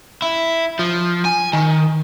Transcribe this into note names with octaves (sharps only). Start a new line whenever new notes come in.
E4
F3
G#5
D#3